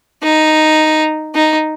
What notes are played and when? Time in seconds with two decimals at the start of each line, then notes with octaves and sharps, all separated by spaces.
0.23 D#4
1.35 D#4